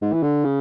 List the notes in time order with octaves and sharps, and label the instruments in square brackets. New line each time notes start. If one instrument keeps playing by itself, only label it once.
[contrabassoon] G#2
E3
D3
C#3